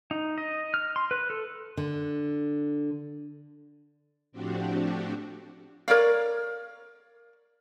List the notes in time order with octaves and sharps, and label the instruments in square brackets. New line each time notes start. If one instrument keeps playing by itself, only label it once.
[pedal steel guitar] D#4
D#5
F6
C6
B4
A4
[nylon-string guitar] D3
[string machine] A2 F3 C4 D4 F#4 G4
[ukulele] A#4 C#5 D5 F5